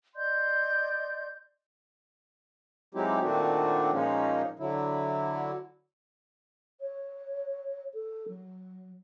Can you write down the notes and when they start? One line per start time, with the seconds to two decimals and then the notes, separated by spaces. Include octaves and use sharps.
0.15 D5 D#5 C6 G6
2.95 F#3 G#3 C4 D#4 E4 G4
3.22 A#2 D#3 A3 C4 D4 F#4
3.93 A#2 F3 G#3 A#3 C#4 D#4
4.59 D3 F#3 E4
6.80 C#5
7.93 A4
8.28 F#3